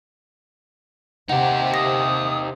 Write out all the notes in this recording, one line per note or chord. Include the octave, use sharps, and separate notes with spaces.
C3 D#4 G4 F#5
D#6 A#6